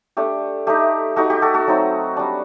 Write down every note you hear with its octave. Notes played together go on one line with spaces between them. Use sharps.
A3 D4 G4
A3 D#4 G4
A3 D#4 F#4
G4
F#4 A4
F#4 A4
F#3 A3 C4 D#4
G3 D4